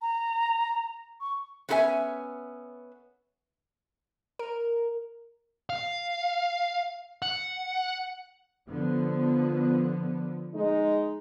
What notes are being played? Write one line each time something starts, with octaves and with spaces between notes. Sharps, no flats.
A#5
C#6
B3 C#4 F#4 A4 E5 G#5
A#4
F5
F#5
D3 F3 B3
G#3 D#4